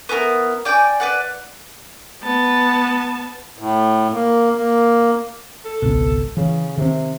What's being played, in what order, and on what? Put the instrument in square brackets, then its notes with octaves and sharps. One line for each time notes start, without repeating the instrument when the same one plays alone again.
[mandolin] B3 E4 A4 A#4
D5 G5 G#5 D6
B4 D5 F#5
[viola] B3 A5
[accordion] A2
A#3
A#3
[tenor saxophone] A4
[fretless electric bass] G#1 C#2 B2
[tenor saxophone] C#3 [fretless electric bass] E3
[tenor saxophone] C3 [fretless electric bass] D#3 C4